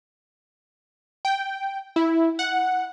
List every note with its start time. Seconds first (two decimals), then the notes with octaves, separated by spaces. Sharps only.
1.25 G5
1.96 E4
2.39 F#5